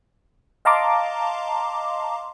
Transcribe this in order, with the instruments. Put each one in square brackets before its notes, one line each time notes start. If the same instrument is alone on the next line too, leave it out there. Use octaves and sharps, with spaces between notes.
[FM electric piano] D#5 F5 A5 A#5 C6 D6